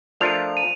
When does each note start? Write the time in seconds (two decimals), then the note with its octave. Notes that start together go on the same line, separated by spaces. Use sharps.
0.20 F3 A3 D4 F4 A#4 F7
0.57 D#7